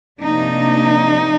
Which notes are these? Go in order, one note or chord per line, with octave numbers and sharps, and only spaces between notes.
C3 F3 A#3 D4 D#4